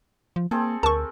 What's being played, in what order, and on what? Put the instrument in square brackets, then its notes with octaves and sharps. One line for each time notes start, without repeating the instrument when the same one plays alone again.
[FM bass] F3
[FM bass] A#3 [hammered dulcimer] C4 G#4 A4
[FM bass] D2 [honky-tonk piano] A#4 [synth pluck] A5 C#6